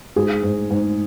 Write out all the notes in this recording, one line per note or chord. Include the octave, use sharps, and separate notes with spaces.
G#2 G#4
G#2
G#2